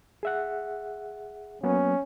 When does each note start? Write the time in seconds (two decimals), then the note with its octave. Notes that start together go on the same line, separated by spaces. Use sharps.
0.23 G#4 E5 F#5
1.63 F#3 A#3 B3 C#4